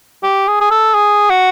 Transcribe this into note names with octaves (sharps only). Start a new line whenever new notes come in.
G4
G#4
G#4
A4
G#4
F#4